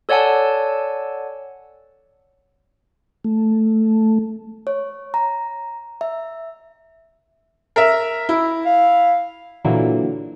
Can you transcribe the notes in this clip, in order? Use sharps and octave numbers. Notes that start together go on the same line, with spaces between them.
A4 C#5 D5 F#5 G#5 A5
A3
C#5
A#5
E5
A#4 E5
E4
F5
A#2 D3 E3 F#3 A#3